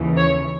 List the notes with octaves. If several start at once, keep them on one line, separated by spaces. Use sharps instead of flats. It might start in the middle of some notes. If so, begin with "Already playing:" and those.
Already playing: D#2 C#3 E3
C#5